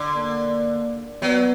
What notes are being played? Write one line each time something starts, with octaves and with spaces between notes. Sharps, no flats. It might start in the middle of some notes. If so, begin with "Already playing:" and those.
Already playing: D3
A#3
F#3 B3